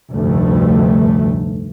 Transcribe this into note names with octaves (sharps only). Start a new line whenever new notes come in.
F1 D2 G2 A3